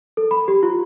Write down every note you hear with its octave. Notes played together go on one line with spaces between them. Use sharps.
A4
B5
G4
F4